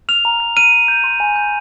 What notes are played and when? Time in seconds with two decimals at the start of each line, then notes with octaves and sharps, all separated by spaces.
0.09 F6 F7
0.25 A#5
0.40 F6
0.57 F6 D#7
0.72 F6
0.88 G6
1.04 C6
1.20 G#5
1.36 G6